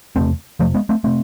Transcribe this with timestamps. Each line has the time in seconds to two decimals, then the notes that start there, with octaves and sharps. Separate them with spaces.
0.16 E2 C3 A3 C4
0.60 F2 C3 F3 A3
0.74 G#3 B3
0.89 A3 C4
1.04 C3 A3 C4